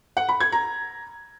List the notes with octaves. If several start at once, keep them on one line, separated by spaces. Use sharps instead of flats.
F#5
B5
G#6
A#5